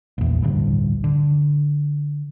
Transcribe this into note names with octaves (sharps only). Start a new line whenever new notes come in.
A#1 E2
A1 D2 G2
D3